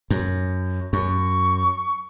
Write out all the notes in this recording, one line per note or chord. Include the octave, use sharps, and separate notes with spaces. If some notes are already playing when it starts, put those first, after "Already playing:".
F#2
F#2 C#6